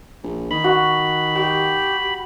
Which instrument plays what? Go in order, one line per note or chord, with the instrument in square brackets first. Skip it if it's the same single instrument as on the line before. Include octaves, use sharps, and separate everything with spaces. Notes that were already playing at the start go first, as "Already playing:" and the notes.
[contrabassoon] A#1
[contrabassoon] D#3 [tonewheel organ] B5
[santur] F#4
[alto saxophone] G4